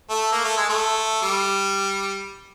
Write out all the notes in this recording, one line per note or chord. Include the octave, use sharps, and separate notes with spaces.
A3
A#3
A3
G#3
A3
G3